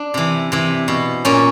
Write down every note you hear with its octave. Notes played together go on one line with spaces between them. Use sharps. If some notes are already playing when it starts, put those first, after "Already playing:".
Already playing: D4
C3 E3
C3 E3
B2
A#2 C#4